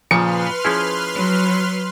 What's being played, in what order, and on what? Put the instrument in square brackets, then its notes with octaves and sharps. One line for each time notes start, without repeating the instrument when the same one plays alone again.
[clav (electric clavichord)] A#2 C#3 [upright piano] F3 C#7 [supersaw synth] B4 C6 F6
[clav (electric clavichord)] F3 C#4 E4 [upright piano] G#4
[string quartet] F#3